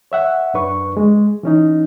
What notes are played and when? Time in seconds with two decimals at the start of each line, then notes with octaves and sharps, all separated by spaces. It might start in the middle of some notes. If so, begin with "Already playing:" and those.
0.12 C#5 E5 F#5
0.54 F#2 D4 B4 C#6
0.97 G#3
1.43 E3 C#4 D#4